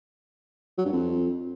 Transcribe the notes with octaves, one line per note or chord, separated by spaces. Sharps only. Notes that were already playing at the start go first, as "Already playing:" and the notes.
F#3
G2
F2